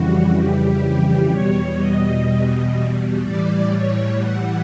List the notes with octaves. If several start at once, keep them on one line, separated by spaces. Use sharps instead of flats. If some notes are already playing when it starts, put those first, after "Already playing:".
Already playing: F2 C#3 E3 G3 F#4
G4
E2 B2 G3 C#5
D#5
A2 E3 G3 D5
C#5
F#5